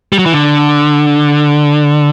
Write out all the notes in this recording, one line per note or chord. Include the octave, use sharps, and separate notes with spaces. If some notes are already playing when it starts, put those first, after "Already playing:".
G3
F#3
E3
D3